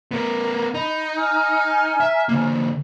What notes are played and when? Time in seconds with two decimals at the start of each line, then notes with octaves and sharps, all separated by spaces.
0.11 B3 A#4
0.74 D#4 B5
1.18 G#5 A#5 F6
2.00 E5
2.29 D3 A#3